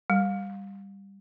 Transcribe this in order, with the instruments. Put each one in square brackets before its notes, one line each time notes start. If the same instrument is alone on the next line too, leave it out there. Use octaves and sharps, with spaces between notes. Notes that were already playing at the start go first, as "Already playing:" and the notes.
[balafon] G3